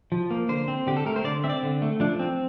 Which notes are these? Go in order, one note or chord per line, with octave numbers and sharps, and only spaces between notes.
F3
A#3
D3 C5
C4
D3 G4
A4
A3 A#4
C5
D3 D5
C4 E5
D5
D3
A3
F3 D4
C4